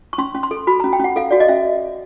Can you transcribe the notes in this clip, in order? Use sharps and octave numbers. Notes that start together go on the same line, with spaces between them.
C#6
C#4 C6
C#4
C6
A4
F#4 B5
C#4 A#5
G5
C#4 F#5
A4 F5
F#4 D5
D#5
C#4 E5